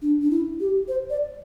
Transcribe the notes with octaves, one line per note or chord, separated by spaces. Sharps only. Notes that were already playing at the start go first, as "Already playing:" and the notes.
D4
D4
E4
G4
C5
D5